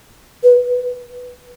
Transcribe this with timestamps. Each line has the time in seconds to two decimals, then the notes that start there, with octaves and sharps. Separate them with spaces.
0.43 B4